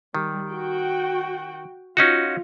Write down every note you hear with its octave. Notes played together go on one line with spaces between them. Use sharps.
D#3 G3
F#4 G5
C#4 D#4 F4 F#4